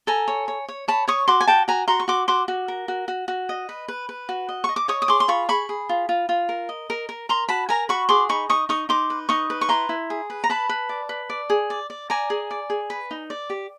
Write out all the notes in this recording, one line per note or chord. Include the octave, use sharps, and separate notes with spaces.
A4 G#5 A#5
C#5
C#5
C#5
C#5 A5 B5
C#5 C#6 D#6
F#4 C6 D6
G#5
F#4 G5 A5
F#4 G#5 A#5
F#4 A#5 C6
C#6
F#4 C6 D6
F#4 C6 D6
F#4
A#4
F#4
F#4
F#4
D#5
B4
B4
B4
F#4
D#5
D#5 C#6
D6
C#5 C#6 D#6
D#6
G#4 C6 D6
C6
F4 B5 C#6
G#4 B5 C#6
G#4
F4
F4
F4
A#4
D#5
A#4
A#4
A#4 A#5 C6
F#4 A5 B5
A#4 G#5 A#5
F#4 B5 C#6
G#4 C6 D6
D#4 B5 C#6
D#4 C#6 D#6
D#4 C#6 D#6
D#4 C6 D6
B4
D#4 C#6 D#6
B4
C#6
E4 A#5 C6
E4
G#4
B4
A#5
B4 A5 B5
B4
D5
B4
D5
G#4
D5
D5
D5 G#5 A#5
G#4
D5
G#4
B4
D#4
D5
G4